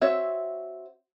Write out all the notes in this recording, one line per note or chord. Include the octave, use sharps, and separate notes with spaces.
C4 F#4 C#5 E5